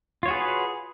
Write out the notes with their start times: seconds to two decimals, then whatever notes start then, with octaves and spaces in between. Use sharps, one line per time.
0.23 F4
0.26 C#5
0.28 F#4
0.31 G#4
0.33 B4